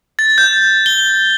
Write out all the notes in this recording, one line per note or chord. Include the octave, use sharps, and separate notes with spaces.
A6
G6
G7